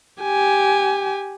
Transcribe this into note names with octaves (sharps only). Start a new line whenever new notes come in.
G4 G#5